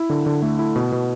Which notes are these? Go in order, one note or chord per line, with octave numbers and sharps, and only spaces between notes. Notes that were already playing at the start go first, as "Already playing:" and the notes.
Already playing: E4
D3
D3
A3
E4
B2
B2